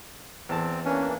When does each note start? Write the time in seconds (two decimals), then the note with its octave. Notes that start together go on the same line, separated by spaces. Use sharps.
0.49 E2 C4 A5
0.85 E3 A#3 C#4 D4